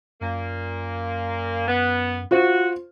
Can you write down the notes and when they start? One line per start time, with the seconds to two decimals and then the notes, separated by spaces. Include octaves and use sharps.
0.21 F#2 A#2 A#3
1.68 B3
2.31 F4 F#4 C5